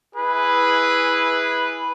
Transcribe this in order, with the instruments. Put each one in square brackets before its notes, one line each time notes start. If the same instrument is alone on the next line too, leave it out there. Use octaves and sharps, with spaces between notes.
[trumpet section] E4 G#4 B4